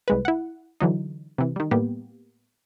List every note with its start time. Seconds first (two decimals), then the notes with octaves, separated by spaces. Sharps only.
0.08 C2 G#3 B4
0.25 E4 F#5
0.80 D3 E3 F#3 D#4
1.38 C3 E3
1.56 D#3 G3
1.71 A2 G3 A#3 B3 G4